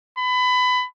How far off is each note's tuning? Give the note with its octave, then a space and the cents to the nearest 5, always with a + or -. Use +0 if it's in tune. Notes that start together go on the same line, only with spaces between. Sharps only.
B5 +25